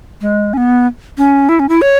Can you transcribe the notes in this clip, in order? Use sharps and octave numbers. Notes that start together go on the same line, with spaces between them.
G#3
C#4
B3
C#4
E4
C#4
E4
C#5